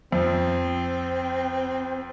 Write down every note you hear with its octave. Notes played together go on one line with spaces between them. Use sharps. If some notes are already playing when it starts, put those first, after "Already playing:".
F2 F3 C4